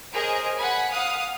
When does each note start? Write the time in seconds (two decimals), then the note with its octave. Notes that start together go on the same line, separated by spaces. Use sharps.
0.12 G#4 A#4 C5 C#5 D#5
0.57 F#5 G#5 B5
0.92 F5 F#5 D#6